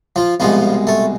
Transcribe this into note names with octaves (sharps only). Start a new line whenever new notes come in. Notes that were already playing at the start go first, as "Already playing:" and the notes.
F3 F4
C2 B2 F3 G#3 F4
A3 A4